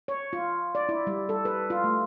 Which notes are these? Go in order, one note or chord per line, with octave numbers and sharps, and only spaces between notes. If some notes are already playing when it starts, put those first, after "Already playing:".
C#5
F4
D5
E4
G3
A4
B4
F4
A3